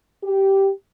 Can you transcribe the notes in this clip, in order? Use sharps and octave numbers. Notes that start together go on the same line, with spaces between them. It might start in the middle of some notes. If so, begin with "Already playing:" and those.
G4